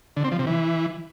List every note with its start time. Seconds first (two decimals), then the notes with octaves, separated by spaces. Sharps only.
0.17 D3
0.24 C4
0.32 F3
0.39 C3
0.47 E3